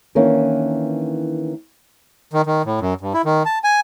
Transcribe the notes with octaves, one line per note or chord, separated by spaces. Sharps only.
D#3 E3 A#3 C#4 D4
D#3
D#3
A2
F#2
G2
E4
D#3
A5
G#5